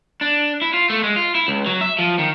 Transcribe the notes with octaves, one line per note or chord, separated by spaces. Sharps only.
D4
E4
F4
A3
G#3
F4
E4
C#2
F#3
E5
F3
D#3